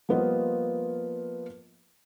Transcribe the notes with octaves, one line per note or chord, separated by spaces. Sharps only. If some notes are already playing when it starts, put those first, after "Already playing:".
F3 G3 A#3 B3 F4 D#5